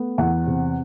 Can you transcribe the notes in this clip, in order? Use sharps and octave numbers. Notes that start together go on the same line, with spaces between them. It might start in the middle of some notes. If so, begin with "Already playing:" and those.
Already playing: A3 B3
E2 F#5
C3